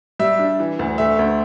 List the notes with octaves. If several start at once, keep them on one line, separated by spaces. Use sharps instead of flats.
G3 E5
D4
E3
D2
A3 E5
D2